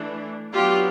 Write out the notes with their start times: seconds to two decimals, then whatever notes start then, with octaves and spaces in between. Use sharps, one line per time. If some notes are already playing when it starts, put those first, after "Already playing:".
Already playing: E3 A3 D4
0.52 F#3 B3 D4 F4 G4